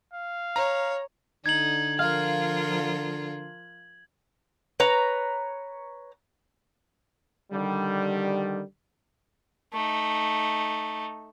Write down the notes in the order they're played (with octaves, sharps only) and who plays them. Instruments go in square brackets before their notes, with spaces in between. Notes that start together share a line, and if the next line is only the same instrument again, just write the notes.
[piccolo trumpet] F5
[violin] C#5 [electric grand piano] A#5
[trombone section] D3 [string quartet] D#4 [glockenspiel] G#6 F#7
[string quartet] F3 F4 A#4 [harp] F5
[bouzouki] B4 C#5 A#5
[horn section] D3 D#3 G3
[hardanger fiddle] A3 D#4